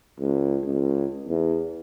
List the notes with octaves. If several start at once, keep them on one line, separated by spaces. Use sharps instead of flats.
C#2
C#2
E2